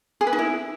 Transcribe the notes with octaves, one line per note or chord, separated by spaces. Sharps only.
G#4
B4
D#4
E4